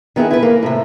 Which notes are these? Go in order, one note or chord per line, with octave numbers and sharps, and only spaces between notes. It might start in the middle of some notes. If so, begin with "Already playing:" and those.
D#3 B3 E4 G#4
E4 B4
A#3
A2 C3